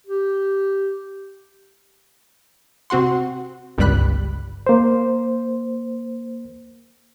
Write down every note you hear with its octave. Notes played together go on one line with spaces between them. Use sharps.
G4
C3 C4 F#4 F#5 C6
G1 C#2 G2 G3 B5 F#6
A#3 C5